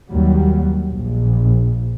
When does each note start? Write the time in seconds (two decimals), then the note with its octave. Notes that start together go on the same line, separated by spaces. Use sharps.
0.12 D#2 F#3 G3
0.92 A#1